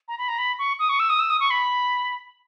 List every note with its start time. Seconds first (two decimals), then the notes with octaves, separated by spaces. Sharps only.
0.08 A#5
0.18 B5
0.29 A#5
0.39 B5
0.59 C#6
0.79 D#6
0.89 C#6
1.00 E6
1.10 D#6
1.20 E6
1.30 D#6
1.40 C#6
1.51 B5